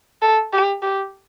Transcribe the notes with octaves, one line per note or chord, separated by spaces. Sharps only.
A4
G4
G4